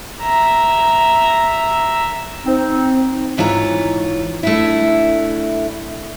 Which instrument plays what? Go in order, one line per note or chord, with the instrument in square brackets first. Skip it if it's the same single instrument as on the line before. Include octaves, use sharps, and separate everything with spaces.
[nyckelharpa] E5 A#5
[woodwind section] C4 D#4
[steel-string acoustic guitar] G#2 E3 F4 C#5 A5 A#5
A3 D4 E4